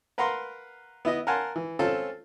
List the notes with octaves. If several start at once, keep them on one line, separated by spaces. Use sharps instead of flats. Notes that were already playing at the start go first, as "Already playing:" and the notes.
A#4 B4 F5 F#5 A#5 C6
B3 E4 D#5
A#4 F5 F#5 G#5 A5 C6
E3
C4 C#4 F4 A4 A5